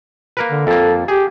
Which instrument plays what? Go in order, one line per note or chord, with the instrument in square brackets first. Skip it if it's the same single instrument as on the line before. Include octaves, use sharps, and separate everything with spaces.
[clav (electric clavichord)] A#3 A#4 B4
[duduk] D3
[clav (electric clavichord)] F2 A#3 [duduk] A4
[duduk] G4 [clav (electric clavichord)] G#4